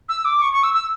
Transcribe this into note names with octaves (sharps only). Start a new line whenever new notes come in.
E6
D6
C#6
C#6
E6
E6